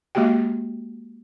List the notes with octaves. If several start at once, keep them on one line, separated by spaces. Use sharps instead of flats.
G#3 A#3 F#4 G4 G5